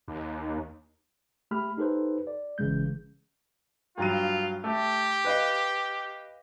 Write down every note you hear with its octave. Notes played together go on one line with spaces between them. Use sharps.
D#2
A3 G4 B5 F6
D#4 G4 A4 B4 C5
D5
G#1 C#3 E3 G#3 G6
G2 F#3 F4 D#7
A3 G4
B4 D#5 F5